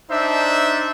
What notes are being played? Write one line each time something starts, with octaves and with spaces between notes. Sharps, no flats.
D4 D#4 C5 E5